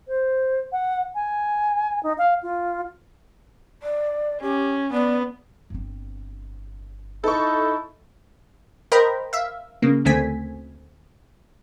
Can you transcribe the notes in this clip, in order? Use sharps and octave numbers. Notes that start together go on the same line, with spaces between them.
C5
F#5
G#5
D#4
F5
F4
D5
C#4 G4
B3 D5
G1 C4
D#4 E4 A4 C#6
A#4 C5 D#5 G5 A#5 B5
E5 F5
C#3 A#3
D2 A3 C4 G#5 B6